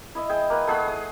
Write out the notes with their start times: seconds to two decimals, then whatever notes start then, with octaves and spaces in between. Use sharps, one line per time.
0.15 E4 D#5 E5
0.29 G#4 G5
0.50 A#3 B4
0.68 A3 G#4 F#5 B5
0.87 D#6